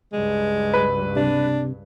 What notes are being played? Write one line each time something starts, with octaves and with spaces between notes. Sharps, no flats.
C#2 G2 G#3
B4
C3 D4